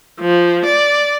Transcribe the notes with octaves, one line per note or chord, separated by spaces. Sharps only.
F3
D5